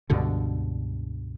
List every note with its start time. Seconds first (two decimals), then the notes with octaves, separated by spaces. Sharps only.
0.10 C#2 G2 B2 D3